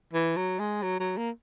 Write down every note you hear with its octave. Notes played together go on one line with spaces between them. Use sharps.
E3
F#3
G#3
F#3
F#3
A#3